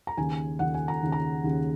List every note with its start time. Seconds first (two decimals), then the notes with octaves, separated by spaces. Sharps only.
0.07 A#5
0.17 D#2 C#3 G#5
0.59 D#2 C#3 F#5
0.74 G#5
0.88 A#5
1.03 D#2 C#3
1.12 A#5
1.44 D#2 C#3